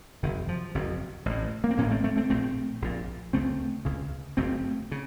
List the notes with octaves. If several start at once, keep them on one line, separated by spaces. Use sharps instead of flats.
F#1 F2 C3 D#3
F3
F#1 F2 C3
A1 A2
A#3
C4
A1 A2 A#3 C#4
A3 C4
A3 C4
A3 C4
A#1 A#2 A3 C4
A#1 A#2
C#2 C#3 A3 C4
C#2 C#3
F#1 F2 C#3 A3 C4
C#3